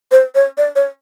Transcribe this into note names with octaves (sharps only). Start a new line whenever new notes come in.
C5
C#5
D5
C#5